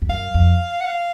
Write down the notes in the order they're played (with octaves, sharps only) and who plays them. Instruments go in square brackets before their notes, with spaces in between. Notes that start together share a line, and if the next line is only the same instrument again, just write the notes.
[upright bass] F2
[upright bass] F#2 [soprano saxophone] F5
[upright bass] F2
[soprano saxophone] F#5
F5